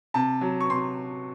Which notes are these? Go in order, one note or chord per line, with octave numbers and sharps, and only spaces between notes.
C3 A5
F#3
C#6
C3 C6